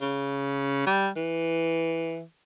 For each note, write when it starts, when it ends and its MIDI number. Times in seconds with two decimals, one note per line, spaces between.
0.01 0.85 49
0.86 1.09 55
1.17 2.23 52